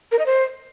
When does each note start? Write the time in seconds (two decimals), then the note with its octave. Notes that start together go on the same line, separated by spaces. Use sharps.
0.12 A#4
0.19 D#5
0.26 C5